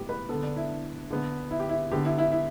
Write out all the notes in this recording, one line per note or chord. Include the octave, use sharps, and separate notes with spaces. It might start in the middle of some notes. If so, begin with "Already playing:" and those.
Already playing: A2 G3 B3 G4
B4
D3 B3 A4
D4
E4
D3 B3
E4
G4
E4
D3 B3 G4
E4
E4
E4